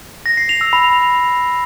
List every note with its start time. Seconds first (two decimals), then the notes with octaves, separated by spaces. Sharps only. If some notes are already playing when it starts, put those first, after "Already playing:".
0.26 A#6
0.37 C7
0.49 F7
0.61 E6
0.73 B5